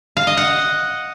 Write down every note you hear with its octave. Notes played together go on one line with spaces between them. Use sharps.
F5
D#5
F#5